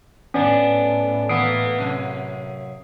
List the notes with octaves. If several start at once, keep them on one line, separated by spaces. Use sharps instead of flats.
A2 B3 C#4 D4 D5
E3 A#3 B3 D#6 C7 D7
F#2 C3